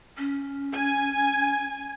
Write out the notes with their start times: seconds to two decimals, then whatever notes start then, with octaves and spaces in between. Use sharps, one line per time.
0.18 C#4
0.73 G#5